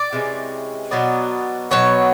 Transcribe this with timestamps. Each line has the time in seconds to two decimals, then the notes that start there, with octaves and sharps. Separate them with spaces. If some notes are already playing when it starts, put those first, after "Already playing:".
Already playing: D5
0.13 C3 E3 G#3 C#4
0.91 B2 F#3 B3 D4
1.71 B2 F#3 B3 C#5